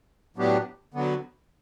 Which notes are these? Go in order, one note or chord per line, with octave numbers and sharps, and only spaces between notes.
A2 F#3 B3 D4 G4
D3 F#3 B3